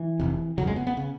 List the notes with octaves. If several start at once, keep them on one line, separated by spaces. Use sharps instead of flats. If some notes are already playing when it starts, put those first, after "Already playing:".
Already playing: E3
F1 F2 C3
G1 F2 C#3 F#3
G#3
B3
B3
C#3